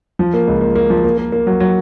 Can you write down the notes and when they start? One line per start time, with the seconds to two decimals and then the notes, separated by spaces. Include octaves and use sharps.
0.19 F3
0.34 A#3
0.47 C#2
0.61 A#3
0.76 A#3
0.90 F3
1.04 A#3
1.18 A#3
1.32 A#3
1.47 F#3
1.60 F#3